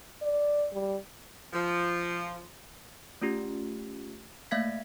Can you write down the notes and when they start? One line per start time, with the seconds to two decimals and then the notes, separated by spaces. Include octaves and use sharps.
0.22 D5
0.73 G3
1.53 F3
3.21 A3 C#4 F4 G4
4.51 A3 A#3 E5 F5 G#6 B6